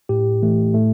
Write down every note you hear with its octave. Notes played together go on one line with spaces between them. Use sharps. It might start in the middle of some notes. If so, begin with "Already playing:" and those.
A2 G4
E3 A3
A2 A3